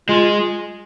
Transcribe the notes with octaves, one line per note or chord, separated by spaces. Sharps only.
G#3 F4